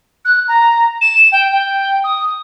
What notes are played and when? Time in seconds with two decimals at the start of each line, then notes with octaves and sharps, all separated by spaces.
0.25 F#6
0.48 A#5
1.01 E7
1.32 G5
1.52 G5
2.04 D#6